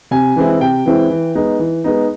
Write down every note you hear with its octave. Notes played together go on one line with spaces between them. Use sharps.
C3 G#5
E3 G#3 C4 E4
C3 G5
E3 G#3 C4 E4
E3
G#3 B3 D#4
E3
G#3 B3 D#4